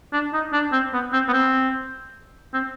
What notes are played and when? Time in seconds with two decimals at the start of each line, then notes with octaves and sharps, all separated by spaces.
0.13 D4
0.33 D#4
0.53 D4
0.72 C4
0.93 B3
1.13 C4
1.28 B3
1.33 C4
2.54 C4